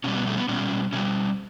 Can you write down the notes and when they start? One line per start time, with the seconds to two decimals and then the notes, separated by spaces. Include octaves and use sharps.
0.04 B2 G3 C#4
0.15 B3
0.27 A3
0.37 B3
0.49 B2 G3 C#4
0.93 B2 G3 C#4